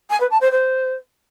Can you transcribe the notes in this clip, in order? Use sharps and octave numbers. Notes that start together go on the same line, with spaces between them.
G#5
B4
A5
C5
C5